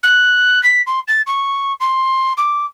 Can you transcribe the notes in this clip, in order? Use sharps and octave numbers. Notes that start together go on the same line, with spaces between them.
F#6
B6
C6
A6
C#6
C6
D6